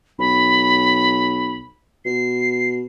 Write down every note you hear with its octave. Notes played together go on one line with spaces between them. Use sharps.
B1 B5
B2 C7